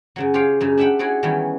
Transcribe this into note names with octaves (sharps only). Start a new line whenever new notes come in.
F#2 C#3 F#3
F4 G4 G#4 C#5 F5 G5
F#2 C#3 D#4
D4 G4 E5 F#5 G5 B5
E4 F#4 G#4 C#5 D5
D#3 E3 G3 B3 C#4